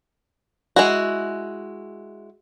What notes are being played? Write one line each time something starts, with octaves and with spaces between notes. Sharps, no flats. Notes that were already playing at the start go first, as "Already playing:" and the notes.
G#3 E4 F#4